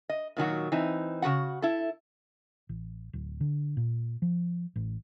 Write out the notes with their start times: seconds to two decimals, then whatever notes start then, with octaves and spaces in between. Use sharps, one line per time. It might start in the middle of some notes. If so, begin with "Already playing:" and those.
0.09 D#5
0.37 A#2 D#3 F#3 F#4
0.72 E3 C4 D#4
1.22 C#3 F3 F#4 F#5
1.62 E4 A4
2.69 A1
3.13 D1
3.40 D3
3.77 A#2
4.22 F3
4.76 A1